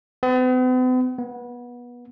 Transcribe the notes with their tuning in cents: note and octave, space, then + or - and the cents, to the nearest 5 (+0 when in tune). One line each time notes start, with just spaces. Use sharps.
B3 +45
B3 -25